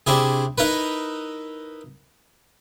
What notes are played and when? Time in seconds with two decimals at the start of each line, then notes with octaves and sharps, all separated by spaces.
0.07 C3 D4 E4 G#4
0.58 D#4 E4 A#4 B4